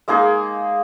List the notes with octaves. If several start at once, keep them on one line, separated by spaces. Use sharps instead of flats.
G#3 A#3 D#4 G#4